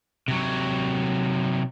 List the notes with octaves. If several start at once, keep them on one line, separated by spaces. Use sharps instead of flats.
C3 F#3